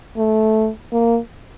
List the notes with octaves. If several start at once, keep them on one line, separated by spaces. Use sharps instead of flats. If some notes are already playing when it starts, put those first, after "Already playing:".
A3
A#3